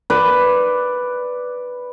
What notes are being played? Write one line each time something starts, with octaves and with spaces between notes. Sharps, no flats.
B4 D5